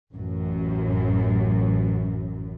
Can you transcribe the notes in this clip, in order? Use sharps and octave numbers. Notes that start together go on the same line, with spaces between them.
A1 F#2